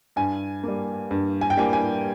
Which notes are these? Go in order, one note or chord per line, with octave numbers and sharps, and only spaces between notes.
G2 G#5
G3 A#3
G2
G#5
G5
G3 A#3 G#5
G#5